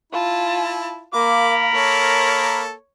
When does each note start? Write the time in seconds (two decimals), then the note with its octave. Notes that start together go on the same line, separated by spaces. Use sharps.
0.13 E4 F4 A5
1.13 A#3 A#4 F5 B5 D6
1.74 A#3 A4 C#5